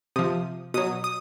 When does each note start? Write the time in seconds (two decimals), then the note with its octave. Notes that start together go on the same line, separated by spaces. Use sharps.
0.16 C3 F3 D#6
0.74 B2 F#3 D#6
1.04 D#6